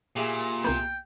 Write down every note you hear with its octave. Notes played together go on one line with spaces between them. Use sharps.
A#2 E4 G4 G#4
C2 A#3 B3 G5